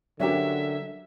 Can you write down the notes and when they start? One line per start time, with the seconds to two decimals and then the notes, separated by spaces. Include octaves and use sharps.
0.20 D3 F#3 C#4 D4 F#4 G4 A#4 E5